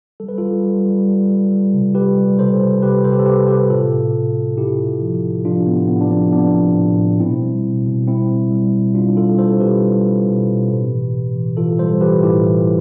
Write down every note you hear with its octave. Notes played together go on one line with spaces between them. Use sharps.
G3 A4
B4
G3 F4 A4
G3
G3
G3
G3
G3
C3
G3 G4 B4
G3
C3 A4 C5
C3
C3 G4 B4
C3 A4 C5
G4
A4
C3 G4 B4
C3 G4 B4
A2 F4 A4
A2
A2
A2
A2 E4 G4
A2
F3
A2
F3 D4 F4
A2 B3
A2 B3
D4
F3 C4
F3 B3 D4
F3
A2
A2
B2 C4 E4
G3
B2
B2
G3 C4 E4
B2
G3
B2
G3 D4 F4
G3 F4 A4
G3 A4 C5
B2 G4 B4
G3
G3
B2
B2
A2
E3
A2
E3
E3 F4 A4
G3 A4 C5
E3 G4 B4
A2 E4 G4
E3